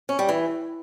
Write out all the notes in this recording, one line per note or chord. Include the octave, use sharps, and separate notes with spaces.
C#4
G3
E3